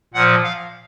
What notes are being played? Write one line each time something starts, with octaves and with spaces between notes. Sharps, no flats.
A#2 F3 F#5
F5